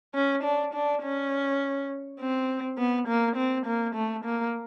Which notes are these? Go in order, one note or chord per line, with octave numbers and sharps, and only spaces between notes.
C#4
D4
D4
C#4
C4
B3
A#3
C4
A#3
A3
A#3